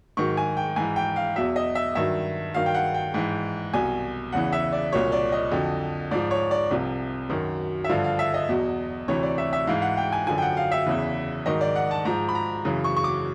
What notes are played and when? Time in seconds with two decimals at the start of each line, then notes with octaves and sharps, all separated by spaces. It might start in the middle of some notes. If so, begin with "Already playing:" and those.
0.17 G#2 D#3 F#3 C#6
0.37 G#5
0.57 G5
0.76 G#2 E3 G#5
0.96 G5
1.16 F5
1.36 E2 B2 F#3 E5
1.56 D#5
1.75 E5
1.95 G2 D#3 F#3 E5
2.54 G2 D#3 F#3 F5
2.66 G5
2.74 F#5
2.94 G5
3.14 G#2 E3
3.74 C2 B2 F#3 G#5
4.32 E2 C#3 E3 F#5
4.53 E5
4.73 D5
4.93 C2 A#2 F#3 C#5
5.12 D5
5.32 D#5
5.52 F2 D3 F#3
6.11 G#2 F3 D5
6.31 C#5
6.51 D5
6.71 C2 C3 F3
7.30 F#2 D#3 F#3
7.84 E5
7.89 G2 D3 F3 F5
8.04 F5
8.19 E5
8.34 D#5
8.49 E2 B2 F#3
9.08 D2 C3 E3 C#5
9.23 D5
9.38 E5
9.53 E5
9.67 G#2 E3 F5
9.82 F#5
9.97 G5
10.12 G#5
10.27 F#2 D3 F3 G#5
10.38 G5
10.42 F#5
10.57 F5
10.72 E5
10.86 E2 C#3 E3
11.46 G#2 D#3 F#3 D#5
11.61 D5
11.76 F#5
11.91 A5
12.05 G#2 F3 A#5
12.29 B5
12.35 A#5
12.65 F#2 C#3 E3
12.84 C#6
12.96 C#6
13.04 D6